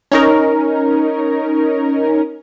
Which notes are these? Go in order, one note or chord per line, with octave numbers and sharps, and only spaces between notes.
C#4 D#4 A#4